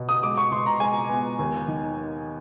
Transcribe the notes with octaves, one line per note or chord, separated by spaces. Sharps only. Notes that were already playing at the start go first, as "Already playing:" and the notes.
Already playing: B2
D#6
G#3 D6
C#6
B2 C6
A#5
G#3 G#5
B3
D#2
D#3